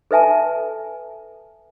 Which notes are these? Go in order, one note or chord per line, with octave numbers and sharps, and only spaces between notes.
A4 B4 E5 G#5 A5